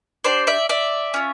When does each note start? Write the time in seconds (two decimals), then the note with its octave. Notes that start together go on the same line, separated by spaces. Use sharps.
0.24 D4 G4 C5 D5
0.47 D5 E5
0.69 D5 E5
1.14 C#4 F4